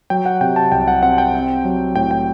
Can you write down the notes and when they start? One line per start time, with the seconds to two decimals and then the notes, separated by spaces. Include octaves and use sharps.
0.10 F#3 G5
0.26 F#5
0.41 C3 G5
0.56 A5
0.72 C2 G5
0.88 F#5
1.03 C4 F#5
1.18 G5
1.34 C4
1.65 F#3
1.96 A2 G5
2.11 G5